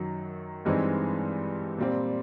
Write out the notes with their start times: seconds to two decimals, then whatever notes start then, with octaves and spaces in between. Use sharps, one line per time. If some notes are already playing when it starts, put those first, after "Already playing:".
Already playing: F#2 D#3 F#3
0.65 G2 E3 G#3 C4 D#4
1.78 A#2 G3 C4